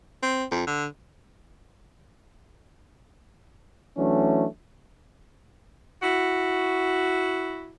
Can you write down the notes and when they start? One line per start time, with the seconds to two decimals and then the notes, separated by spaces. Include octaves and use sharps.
0.23 C4
0.52 F2
0.67 D3
3.98 E3 F#3 A3 C#4 D4
6.02 E4 F#4